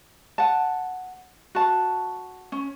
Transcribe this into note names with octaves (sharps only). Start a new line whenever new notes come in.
F#5 A5
F#4 A5
C#4